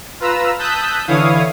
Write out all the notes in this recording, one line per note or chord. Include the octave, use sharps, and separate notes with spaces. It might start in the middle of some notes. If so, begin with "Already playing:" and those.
F4 B4 A#5 E6
A5 D#6 E6 F#6 G6 B6
D3 E3 E4 C#5 F5 D#6